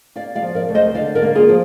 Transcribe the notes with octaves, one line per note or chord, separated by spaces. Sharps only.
A#3 D5 F5
D5 F5
F3
A#4 D5
D2
C5 D#5
D3 D5 F5
A#4 D5
A#3
F4 G#4
F3